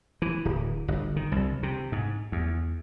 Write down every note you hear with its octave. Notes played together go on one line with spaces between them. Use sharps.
E3
D1
G1
D#3
C2
C3
G#2
E2